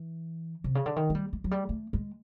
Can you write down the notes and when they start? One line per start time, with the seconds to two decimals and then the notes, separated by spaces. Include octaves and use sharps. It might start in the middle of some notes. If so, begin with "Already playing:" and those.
Already playing: E3
0.64 C3
0.75 C#3
0.86 D3
0.96 D#3
1.10 G#3
1.15 G3
1.33 G#3
1.44 F#3
1.51 G3
1.69 A3
1.93 G#3